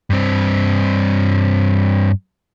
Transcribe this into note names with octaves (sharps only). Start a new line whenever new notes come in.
G2 C4